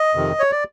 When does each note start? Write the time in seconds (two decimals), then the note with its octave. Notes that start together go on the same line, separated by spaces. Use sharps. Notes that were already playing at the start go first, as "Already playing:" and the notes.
Already playing: D#5
0.15 F2 C3 D#3
0.39 C#5
0.52 D5